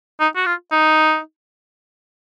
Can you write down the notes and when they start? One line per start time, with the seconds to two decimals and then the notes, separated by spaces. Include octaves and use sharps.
0.20 D#4
0.36 F#4
0.46 F4
0.72 D#4